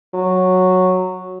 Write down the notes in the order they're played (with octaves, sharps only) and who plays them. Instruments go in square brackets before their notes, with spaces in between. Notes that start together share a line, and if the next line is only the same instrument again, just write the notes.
[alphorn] F#3